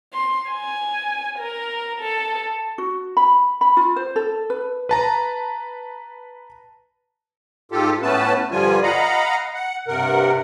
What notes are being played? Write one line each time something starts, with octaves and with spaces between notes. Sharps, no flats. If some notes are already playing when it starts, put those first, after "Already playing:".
C6
G#5
A#4
A4
F#4
B5
B5
F4
C5
A4
B4
B4 A5 A#5
G#2 F4 G4 A4
A2 A3 B3 C#4 B4 A5
G2 D3 F3 G3 F4 G#5
D#5 F5 F#5 A#5 B5
F#5
G2 C3 A#4 F#5